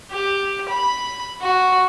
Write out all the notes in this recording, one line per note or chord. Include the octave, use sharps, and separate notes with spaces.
G4
B5
F#4